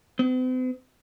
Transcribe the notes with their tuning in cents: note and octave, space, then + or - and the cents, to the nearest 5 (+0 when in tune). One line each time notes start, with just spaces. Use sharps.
C4 -45